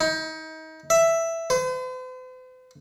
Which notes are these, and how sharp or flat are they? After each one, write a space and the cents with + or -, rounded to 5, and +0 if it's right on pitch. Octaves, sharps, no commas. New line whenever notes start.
D#4 +30
E5 +5
C5 -45